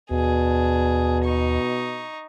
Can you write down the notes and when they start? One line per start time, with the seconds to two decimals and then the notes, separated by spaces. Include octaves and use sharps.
0.11 D#2 B2 D4 G#4
1.25 D#4 C#6